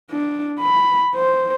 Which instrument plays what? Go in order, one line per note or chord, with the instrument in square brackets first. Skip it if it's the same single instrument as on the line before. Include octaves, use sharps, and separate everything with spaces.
[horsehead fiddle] D4
B5
C5